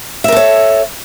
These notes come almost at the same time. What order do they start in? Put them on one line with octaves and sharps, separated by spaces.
E5 A#4 A4 C#5